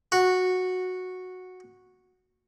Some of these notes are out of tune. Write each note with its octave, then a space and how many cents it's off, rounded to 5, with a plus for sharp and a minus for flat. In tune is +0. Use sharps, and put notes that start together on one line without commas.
F#4 -10